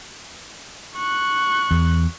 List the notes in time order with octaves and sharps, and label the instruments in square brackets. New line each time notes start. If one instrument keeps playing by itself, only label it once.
[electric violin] C#6 F#6
[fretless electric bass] E2